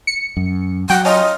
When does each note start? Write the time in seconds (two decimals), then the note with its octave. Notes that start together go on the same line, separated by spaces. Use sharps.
0.07 C#7
0.37 F#2
0.90 F#3 F#5 G5
1.05 C#4 F4 D#5